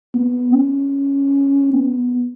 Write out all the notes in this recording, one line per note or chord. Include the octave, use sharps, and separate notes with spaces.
B3
C#4
B3